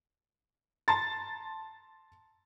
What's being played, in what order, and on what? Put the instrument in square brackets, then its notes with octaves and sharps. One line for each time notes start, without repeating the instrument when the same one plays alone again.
[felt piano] A5 A#5 C6 A6